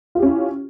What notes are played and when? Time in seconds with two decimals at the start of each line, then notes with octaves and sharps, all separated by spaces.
0.15 F4
0.19 G4
0.23 C#4
0.26 E4